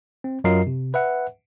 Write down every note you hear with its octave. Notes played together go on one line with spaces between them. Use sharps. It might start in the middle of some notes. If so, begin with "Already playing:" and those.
C4
F#2 F#3 F4 A#4 D#5 C7
C3
B4 E5 F#5